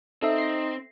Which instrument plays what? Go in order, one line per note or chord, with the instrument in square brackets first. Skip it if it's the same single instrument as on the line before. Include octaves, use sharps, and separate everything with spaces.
[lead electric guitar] C4 [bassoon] D#4 [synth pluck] A4 E5
[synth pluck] A#6 C7